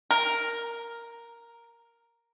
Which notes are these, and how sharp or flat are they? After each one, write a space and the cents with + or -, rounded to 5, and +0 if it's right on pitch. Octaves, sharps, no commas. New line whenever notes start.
A#4 +0